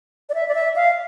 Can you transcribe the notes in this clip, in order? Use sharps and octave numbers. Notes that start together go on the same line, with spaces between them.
D5
E5
D5
E5
F5